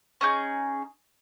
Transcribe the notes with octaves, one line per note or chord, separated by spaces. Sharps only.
C#4 D#4 G#4 G6